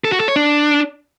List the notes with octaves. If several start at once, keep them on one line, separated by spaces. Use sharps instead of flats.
A4
F#4
A4
C#5
D4